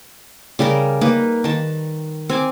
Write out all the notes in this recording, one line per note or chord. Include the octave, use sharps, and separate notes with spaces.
C#3 G3 G4 A#4
A#3 D#4 B4
D#3 A5
C4 G#5 D6